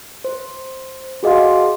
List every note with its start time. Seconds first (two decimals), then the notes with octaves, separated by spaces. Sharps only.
0.24 C5
1.23 F#4 G#4 D#5 F5 C6